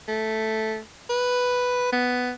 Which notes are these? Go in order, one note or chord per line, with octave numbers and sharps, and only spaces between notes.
A3
B4
B3